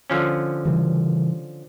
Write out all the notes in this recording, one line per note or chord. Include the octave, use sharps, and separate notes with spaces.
D3 F3 C#4
C#3 E3 G3